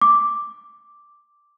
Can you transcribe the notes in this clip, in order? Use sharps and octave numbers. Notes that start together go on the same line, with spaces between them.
D6